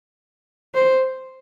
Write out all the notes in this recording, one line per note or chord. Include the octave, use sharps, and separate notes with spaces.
C5